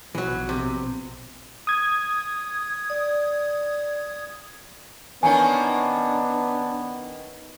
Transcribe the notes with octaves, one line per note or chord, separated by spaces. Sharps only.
A#1 B2 E3 F#3
C3
D#6 G#6
D5
D#3 A#3 B3 C#4 D4 G#5